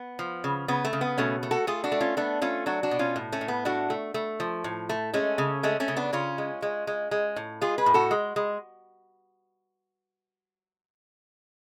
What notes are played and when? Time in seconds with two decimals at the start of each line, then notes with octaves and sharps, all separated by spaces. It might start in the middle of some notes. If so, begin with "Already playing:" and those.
Already playing: B3
0.19 F3
0.44 C#3
0.68 C#3 B3
0.85 A3
0.93 C#3
1.01 B3
1.18 B2 A3 C#4
1.43 A3
1.51 F#4 A4
1.67 A3 F4 G#4
1.84 D4 F#4
1.92 A3
2.00 C#4 F4
2.17 A3 B3 D4
2.42 A3 C#4 F4
2.66 F#3 D4 F#4
2.83 D4 F#4
2.91 B2
2.99 C#4 F4
3.16 A2
3.32 A3 C#4
3.41 A2
3.48 B3
3.65 A3 D4 F#4
3.90 A3
4.14 A3
4.40 F3
4.64 A2
4.89 A3
5.14 G#3 A3 C#4
5.38 C#3
5.63 G#3 A3 C#4
5.80 A3 C#4
5.88 C#3
5.97 B3 D4
6.13 C#3 C#4 F4
6.38 G#3
6.62 G#3
6.87 G#3
7.11 G#3
7.36 A2
7.61 G#3 F4 G#4
7.78 G#4 B4
7.86 A2
7.94 F#4 A4
8.11 G#3
8.36 G#3